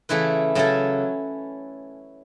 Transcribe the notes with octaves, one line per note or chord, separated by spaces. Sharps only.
C#3 E3 A3 E4 B4
C#3 F#3 C#4 E4 A4